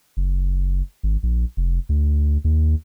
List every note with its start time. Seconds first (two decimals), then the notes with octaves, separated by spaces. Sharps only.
0.17 F#1
1.03 G#1
1.23 A#1
1.57 F1
1.89 D2
2.45 D#2